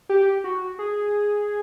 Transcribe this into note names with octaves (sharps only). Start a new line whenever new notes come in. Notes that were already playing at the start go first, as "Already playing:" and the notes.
G4
F#4
G#4